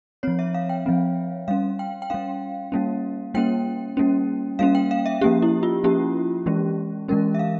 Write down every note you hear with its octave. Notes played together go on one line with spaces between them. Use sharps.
F3 C4 C#5
E5
F5
G5
F3 C4
G3 C#4 F5
G5
G5
G3 C#4 F5
G3 A#3 C#4
G3 A#3 C#4 G5
G3 A#3 C#4
G3 A#3 C#4 F5
G5
F5
E5
F3 A#3 C#4 G4
E4
F4
F3 A#3 C#4 G4
E3 G#3 C#4
E3 G#3 C#4 A#4
E5
F5